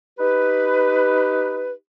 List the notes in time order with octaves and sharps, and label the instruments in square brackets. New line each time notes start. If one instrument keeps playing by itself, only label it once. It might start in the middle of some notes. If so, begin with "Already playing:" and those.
[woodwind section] D#4 G4 B4